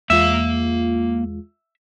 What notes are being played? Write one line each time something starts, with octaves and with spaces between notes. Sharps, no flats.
E2 G#3 A#3 F4 E5 F5